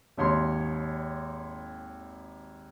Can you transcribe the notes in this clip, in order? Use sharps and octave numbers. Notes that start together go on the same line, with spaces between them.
G#1 D#2 C#5 C6